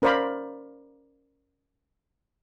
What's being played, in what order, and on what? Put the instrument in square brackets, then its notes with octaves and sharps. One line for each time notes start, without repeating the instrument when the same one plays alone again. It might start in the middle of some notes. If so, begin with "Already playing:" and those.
[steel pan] C#4 A#4 C5 D5 F5 B5